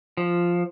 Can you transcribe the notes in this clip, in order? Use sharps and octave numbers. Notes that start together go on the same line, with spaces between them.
F3